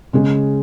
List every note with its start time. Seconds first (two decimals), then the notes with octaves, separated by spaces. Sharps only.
0.13 C#3 G#3 C#4 G#4